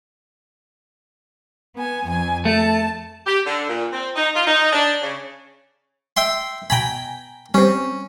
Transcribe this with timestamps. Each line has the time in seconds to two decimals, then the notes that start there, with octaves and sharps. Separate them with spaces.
1.74 B3 G#5
2.05 F2 G#5
2.45 A3 A5
3.26 G4
3.46 D3
3.69 A#2
3.93 C4
4.16 D#4
4.34 F4
4.47 D#4
4.73 D4
5.02 C#3
6.17 E5 G5 C6
6.70 B2 G5 G#5 A#5 B5
7.54 G3 C4 C#4